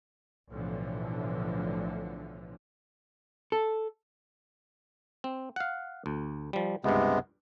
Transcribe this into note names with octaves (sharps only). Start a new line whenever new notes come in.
B1 A2 D3 E3 F3
A4
C4
F5 F#5
D2
F3 G3
C#2 G2 C3 G#3 B3